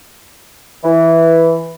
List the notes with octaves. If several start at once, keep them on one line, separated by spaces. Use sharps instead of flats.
E3